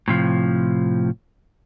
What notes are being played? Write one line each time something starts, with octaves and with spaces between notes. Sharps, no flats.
A2 C3 F3